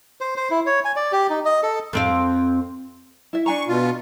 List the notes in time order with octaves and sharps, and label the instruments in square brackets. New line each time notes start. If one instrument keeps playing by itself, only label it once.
[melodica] C5
C5
E4
C#5
G#5
D5
G4
D#4
D#5
A4
[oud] F2 C4 F5
[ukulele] E4 E5
[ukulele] D4 G#5 A#5 [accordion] C#6
[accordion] B2 F4